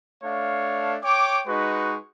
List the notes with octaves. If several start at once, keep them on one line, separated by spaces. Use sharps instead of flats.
A3 D4 C#5 F5
C#5 G5 D6
G#3 D#4 F#4 B4 C#6